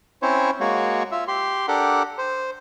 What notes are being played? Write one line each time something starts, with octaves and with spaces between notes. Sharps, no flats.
C4 C#4 E4 C5 C#5
G#3 A#3 F#4 C#5
F4 E5
G4 C6
D4 G4 A4 A#4 F#5
C5